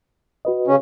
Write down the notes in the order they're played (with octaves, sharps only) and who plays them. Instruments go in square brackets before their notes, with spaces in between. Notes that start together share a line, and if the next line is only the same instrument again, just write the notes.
[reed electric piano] F#4 B4 D#5
[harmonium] C#3 C#4